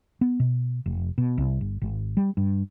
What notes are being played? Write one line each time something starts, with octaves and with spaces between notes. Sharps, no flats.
B3
B2
F1
B2
C2
G1
G#1
G3
G2